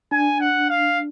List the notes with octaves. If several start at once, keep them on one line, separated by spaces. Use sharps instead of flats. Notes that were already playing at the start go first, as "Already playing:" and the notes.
D4 G#5
F#5
F5